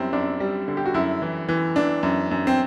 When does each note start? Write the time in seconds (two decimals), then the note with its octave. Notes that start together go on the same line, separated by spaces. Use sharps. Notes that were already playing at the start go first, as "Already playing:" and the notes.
Already playing: F#2 G3 C4 E4
0.13 F#2 D4
0.40 G3
0.68 D3
0.77 G4
0.86 F#4
0.94 F#2 E4
1.22 E3
1.49 E3
1.76 E3 D4
2.03 F#2
2.31 F#2
2.47 C4